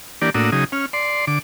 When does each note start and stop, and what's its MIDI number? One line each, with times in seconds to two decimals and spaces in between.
0.22 0.30 52
0.22 0.30 58
0.22 0.30 62
0.22 0.30 67
0.22 0.30 74
0.35 0.50 45
0.35 0.50 58
0.35 0.50 62
0.35 0.50 66
0.35 0.50 87
0.35 0.50 88
0.52 0.64 49
0.52 0.64 54
0.52 0.64 63
0.52 0.64 68
0.52 0.64 87
0.72 0.86 61
0.72 0.86 89
0.93 1.25 74
0.93 1.25 84
1.27 1.39 50
1.27 1.39 86